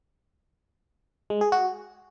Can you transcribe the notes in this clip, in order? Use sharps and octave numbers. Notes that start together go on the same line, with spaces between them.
G#3
G#4
F#4